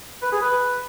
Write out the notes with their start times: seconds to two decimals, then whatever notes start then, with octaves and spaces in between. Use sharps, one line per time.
0.22 B4
0.32 G#4
0.42 B4